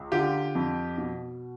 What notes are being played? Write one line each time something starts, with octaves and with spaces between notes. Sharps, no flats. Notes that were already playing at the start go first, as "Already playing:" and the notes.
Already playing: C#2
D3 F4 G4
F2
B2